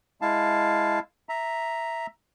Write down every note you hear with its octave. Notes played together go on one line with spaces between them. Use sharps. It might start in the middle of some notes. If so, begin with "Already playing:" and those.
G#3 E4 F5 A5
E5 A#5